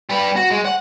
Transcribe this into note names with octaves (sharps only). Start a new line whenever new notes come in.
G3 B4
F#4
G#3
F#5